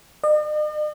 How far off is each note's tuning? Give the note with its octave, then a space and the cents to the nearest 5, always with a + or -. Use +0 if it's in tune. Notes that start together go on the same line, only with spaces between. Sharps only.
D#5 -45